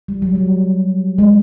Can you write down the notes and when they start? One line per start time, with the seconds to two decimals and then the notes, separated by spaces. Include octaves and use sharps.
0.08 G3
0.22 F#3
0.35 G3
1.18 G#3